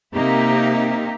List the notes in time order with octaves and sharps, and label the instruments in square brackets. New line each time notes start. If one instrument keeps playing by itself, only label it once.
[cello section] C3 A#3 D#4 G4 E5